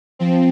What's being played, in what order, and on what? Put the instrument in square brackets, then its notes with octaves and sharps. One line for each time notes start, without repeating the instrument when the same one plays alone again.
[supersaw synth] F3 C4